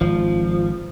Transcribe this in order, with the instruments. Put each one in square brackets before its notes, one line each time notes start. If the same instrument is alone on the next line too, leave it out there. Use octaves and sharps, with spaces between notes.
[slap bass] G#1 [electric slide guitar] F3